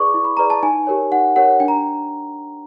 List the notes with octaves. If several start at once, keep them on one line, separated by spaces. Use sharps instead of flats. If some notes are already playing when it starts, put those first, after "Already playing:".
Already playing: E4 G#4 B4 D5 C#6 D6
E4
B5
G#4 B4 D5 A#5
A5
D#4 G#5
G4 A#4 C#5
D#4 F#5
G4 A#4 C#5 F#5
D4 G5
A#5